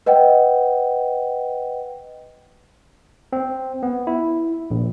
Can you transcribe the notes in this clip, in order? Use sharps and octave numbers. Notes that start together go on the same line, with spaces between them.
B4 D#5 F#5 G5
C4
B3
E4
A#1